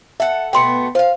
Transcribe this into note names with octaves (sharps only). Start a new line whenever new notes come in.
A4 E5 F#5
B2 A3 B3 G5 C6 C#7
F4 C5 F5